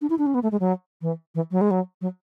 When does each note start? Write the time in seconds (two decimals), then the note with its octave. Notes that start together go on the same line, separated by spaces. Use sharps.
0.01 D4
0.10 E4
0.18 D4
0.26 C#4
0.34 B3
0.43 A3
0.52 G#3
0.60 F#3
1.02 E3
1.35 E3
1.51 F#3
1.61 G#3
1.71 F#3
2.01 F#3